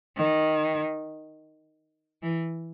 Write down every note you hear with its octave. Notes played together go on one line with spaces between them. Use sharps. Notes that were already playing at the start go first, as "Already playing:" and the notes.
D#3
E3